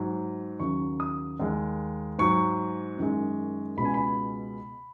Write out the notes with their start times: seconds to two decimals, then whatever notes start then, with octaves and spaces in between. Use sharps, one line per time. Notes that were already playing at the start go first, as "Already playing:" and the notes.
Already playing: G#2 F#3
0.60 D#2 C#3 F#3 C#6
1.00 D#6
1.40 D#2 D#3 G#3
2.19 G#2 F#3 C#6
2.97 F#2 D#3 G#3
3.77 C#2 B2 G#3 B5
3.85 G#5
3.94 B5